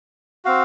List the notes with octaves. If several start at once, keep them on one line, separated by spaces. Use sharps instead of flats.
C4 F#4 F5